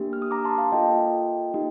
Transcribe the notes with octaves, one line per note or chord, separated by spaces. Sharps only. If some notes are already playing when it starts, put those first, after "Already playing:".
Already playing: A#3 D4 G4
F6
D#6
A#5 D6
A5 C6
F5 A5
A#3 F4 A4 D#5 G5
A#3 D#4 G4